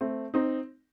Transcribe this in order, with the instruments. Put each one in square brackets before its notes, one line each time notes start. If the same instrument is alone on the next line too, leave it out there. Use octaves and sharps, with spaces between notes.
[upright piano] A3 C4
C4 D#4